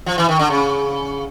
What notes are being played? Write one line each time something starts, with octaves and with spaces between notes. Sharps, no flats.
F3
E3
D#3
D3
C#3